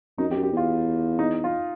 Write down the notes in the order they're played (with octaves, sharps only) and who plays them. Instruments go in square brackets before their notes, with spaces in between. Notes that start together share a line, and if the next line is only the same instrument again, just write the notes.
[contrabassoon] F#2 [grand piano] D#4
[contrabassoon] F2 [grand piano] G4
[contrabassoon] F#2
[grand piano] G4
[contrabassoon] E2 [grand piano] F4
[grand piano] D#4
F4